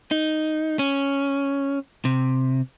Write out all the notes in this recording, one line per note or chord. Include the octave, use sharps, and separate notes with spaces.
D#4
C#4
C3